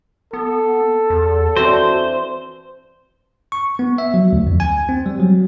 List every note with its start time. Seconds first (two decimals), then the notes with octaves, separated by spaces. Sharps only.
0.33 B3 A4
1.10 E2
1.57 E3 C4 D4 F#4 C5
3.52 C#6
3.79 B3
3.98 E5
4.14 F#3
4.33 D2
4.47 F2
4.60 G#5
4.89 C4
5.06 G3
5.20 F#3